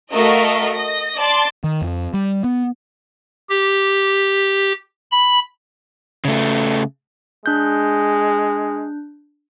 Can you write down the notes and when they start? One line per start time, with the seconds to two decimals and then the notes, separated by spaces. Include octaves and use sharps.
0.12 A3 F#4 A#4 D#5 F5
0.75 D#5 A#6
1.18 D5 A5 C6 A6
1.64 D#3
1.82 F2
2.14 G3
2.44 B3
3.49 G4
5.11 B5
6.25 C#3 A3
7.46 G#3 D4 F#6 G6